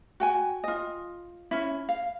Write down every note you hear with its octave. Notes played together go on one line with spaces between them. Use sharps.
F#4 G5 G#5
F4 D#5
C#4 E4
F5